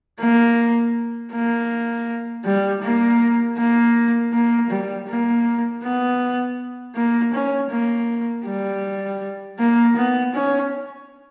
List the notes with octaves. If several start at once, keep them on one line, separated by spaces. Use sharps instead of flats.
A#3
A#3
G3
A#3
A#3
A#3
G3
A#3
B3
A#3
C#4
A#3
G3
A#3
B3
C#4